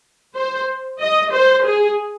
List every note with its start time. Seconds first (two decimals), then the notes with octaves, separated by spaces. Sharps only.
0.36 C5
1.00 D#5
1.32 C5
1.64 G#4